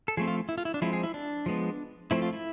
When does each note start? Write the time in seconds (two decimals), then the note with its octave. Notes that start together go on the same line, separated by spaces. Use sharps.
0.08 A4
0.17 F3 A3 C4 G#4
0.28 F4
0.49 E4
0.58 F4
0.65 E4
0.74 D4
0.82 F3 G#3 C4 E4
0.93 G#4
1.03 E4
1.14 D4
1.46 F3 G#3 B3
2.11 F3 A3 C4 E4
2.22 F4
2.33 E4